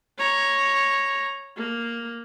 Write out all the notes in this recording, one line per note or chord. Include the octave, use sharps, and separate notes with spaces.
C#5 A#5
A#3